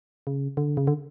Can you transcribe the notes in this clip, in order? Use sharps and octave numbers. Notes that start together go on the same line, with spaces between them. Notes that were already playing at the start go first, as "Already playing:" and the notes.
C#3
D3
C#3
D3